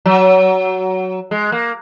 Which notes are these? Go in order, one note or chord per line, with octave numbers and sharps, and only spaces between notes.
F#3
G#3
A#3